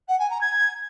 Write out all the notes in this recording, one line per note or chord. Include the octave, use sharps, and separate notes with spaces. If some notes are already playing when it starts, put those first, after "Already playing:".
F#5
G#5
A#5
G#6